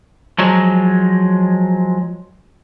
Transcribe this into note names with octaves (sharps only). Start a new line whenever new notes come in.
F3 F#3 G#3